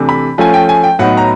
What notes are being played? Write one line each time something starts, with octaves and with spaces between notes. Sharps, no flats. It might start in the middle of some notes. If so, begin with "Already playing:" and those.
Already playing: C3 E3 A3 D4
B5
F3 A3 C#4 G#5
G5
G#5
G5
A2 F#3 B3 D#4 F#5
A#5